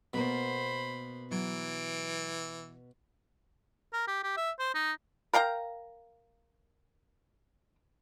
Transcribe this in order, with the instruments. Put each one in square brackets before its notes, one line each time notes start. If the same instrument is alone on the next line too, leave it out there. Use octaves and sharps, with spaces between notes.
[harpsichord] B2 [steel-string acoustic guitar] A#3 B3 A#4 [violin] C5 B5
[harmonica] E3 [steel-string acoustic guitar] F#3 [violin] D7
[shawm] A#4
G4
G4
E5
C5
D#4
[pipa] A#4 F5 G5 A#5